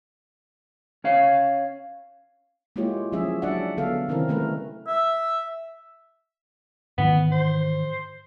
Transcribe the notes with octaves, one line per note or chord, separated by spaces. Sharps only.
C#4 C#5 F5
G#3 A#3 E4 F4 G4 C#5
F3 F#3 G#3 C#4 G#4 E5
F#3 D4 D5 E5 F#5
D3 F#3 B3 A4 F5
C3 D#3 C4 C#4 E4 A#4
G#3 A3 A#4 B4
E5
G#2 D#3 E3 B3
C5